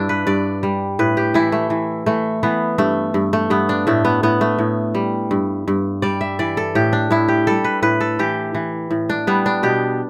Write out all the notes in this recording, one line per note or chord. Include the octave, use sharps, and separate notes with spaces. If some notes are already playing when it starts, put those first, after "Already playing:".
Already playing: G2 D4 E4
B4
G2 D5
G3
A2 B4
G4
E3 E4
A3
E3
E3 A3
E3 B3
G2 A3
G2
A3
G2 B3
D4
A2 A3
B3
A2 B3
A3
A2
G3
G2
G2
G3 D5
E5
E3 D5
A4
A2 G4
D4
A2 E4
G4
G3 A4
B4
A2 B4
A4
E3 G4
E3
A2
D4
G3 B3
D4
B2 G4